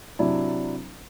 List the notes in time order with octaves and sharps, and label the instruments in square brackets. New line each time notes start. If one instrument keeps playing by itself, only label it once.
[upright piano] C3 F#3 D4 E4